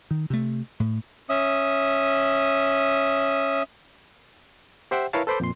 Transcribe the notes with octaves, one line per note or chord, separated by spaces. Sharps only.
D#3
C3 A3
A2
C#4 E5 D#6
G4 C5 E5 F#5 G5
E4 A#4 B4 C#5 F5 A5
A4 B4 C5 B5 D6 G6
F2 A#2 C6